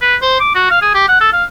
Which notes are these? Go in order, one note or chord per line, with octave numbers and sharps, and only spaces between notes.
B4
C5
D6
F#4
F5
G#4
G4
F#5
A4
F5